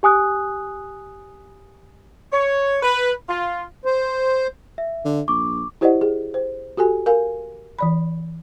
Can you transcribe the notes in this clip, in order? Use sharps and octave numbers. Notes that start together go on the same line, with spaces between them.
G4 G#5 D#6 F#6
C#5
B4
F4
C5
E5
D3
A#1 C#6 D6
E4 G4 C5 D5 D#5 F#5
G#4
C5
F#4 G4 A4 G#5
A#4 F5 G#5
E3 D5 B5